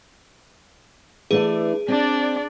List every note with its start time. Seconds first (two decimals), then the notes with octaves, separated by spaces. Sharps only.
1.31 E3 A3 D4 G#4
1.88 C4 D4 D5